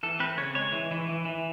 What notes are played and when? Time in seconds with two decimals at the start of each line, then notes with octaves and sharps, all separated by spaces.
0.03 E3 A4
0.19 C4 B4
0.37 C#3 C#5
0.55 G#3 C#5
0.72 E3
0.91 E3
1.09 E3
1.25 E3